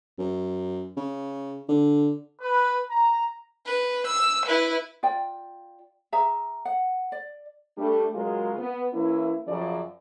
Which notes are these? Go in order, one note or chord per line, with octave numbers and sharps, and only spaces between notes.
F#2
C#3
D3
B4
A#5
B4
E6
E4 B4
F4 D5 G5
G#4 E5 A#5
F#5
D5
G3 A3 D4
C#3 F#3 G#3 F4 G#4 A#4
B3
E3 A#3 C#4 E4
F#2 C#3 F3 D5